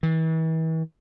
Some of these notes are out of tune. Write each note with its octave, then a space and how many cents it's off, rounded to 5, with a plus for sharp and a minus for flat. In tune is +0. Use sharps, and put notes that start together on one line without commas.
E3 -40